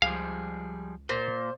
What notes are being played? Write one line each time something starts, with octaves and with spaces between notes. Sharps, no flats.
C#2 F3 G3 G#4 F5
A#2 C5